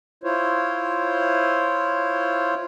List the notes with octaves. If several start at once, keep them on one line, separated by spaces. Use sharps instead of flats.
E4 F4 C5 C#5